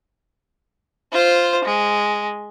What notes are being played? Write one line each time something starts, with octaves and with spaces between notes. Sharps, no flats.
F4 C5
G#3